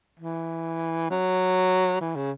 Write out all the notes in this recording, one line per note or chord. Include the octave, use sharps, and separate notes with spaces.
E3
F#3
E3
C#3